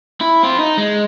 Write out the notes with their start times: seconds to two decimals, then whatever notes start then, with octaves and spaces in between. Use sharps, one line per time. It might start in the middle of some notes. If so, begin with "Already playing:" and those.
0.21 E4
0.43 C4 F4
0.59 D#4
0.77 G#3